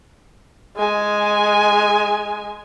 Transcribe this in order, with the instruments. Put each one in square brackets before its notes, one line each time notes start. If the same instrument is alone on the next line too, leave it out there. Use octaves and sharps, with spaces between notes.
[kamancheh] G#3 G#5